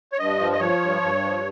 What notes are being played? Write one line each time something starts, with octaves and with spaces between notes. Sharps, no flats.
C#5
G2 D#5
F3
D#5
F3 C#5
G2
G2
F3